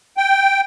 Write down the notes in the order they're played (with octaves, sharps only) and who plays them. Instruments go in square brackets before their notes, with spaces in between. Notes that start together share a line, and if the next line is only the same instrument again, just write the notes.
[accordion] G5